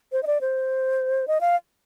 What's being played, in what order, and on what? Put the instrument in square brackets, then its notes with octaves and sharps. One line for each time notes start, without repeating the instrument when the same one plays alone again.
[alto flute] C5
D#5
D5
C5
D#5
F5